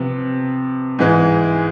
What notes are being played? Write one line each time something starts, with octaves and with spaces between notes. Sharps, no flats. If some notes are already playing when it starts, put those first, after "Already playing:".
Already playing: C3 F3 B3
G#2 E3 G#3